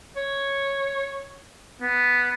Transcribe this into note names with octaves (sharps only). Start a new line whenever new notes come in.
C#5
B3